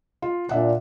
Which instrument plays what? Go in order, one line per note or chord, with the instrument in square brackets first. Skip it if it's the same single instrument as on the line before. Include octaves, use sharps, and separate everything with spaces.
[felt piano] F4
[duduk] A#2 [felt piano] D4 E5 F#5